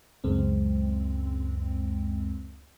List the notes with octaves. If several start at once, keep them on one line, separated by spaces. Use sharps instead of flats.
C#2 F#2 G#3 C4